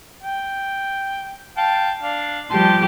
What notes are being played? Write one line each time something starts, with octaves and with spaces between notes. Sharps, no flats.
G5
F5 G5 A5
D4 F5
F3 G3 G4 A5 C6